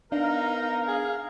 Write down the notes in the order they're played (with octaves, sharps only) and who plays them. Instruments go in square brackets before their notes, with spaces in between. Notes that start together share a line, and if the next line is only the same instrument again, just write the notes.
[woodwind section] B3 A#4 [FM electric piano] D4 [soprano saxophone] D#4 [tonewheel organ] F5
[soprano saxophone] G#4